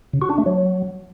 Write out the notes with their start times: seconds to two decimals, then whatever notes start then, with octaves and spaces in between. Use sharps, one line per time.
0.13 C#3
0.22 F#4
0.30 D4
0.38 A3
0.46 F#3